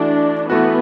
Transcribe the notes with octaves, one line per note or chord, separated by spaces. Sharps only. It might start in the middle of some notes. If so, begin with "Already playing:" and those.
Already playing: E3 A3 D4 F#4
E3 A3 B3 F#4